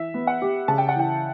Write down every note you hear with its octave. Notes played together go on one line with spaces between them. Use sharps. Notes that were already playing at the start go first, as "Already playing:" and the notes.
Already playing: E3 E5
B3
F#5
G4
C#3 A5
G5
F#5
E3 G5